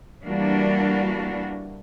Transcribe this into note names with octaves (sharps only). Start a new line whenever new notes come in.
E3 G3 A#3 D4 F#4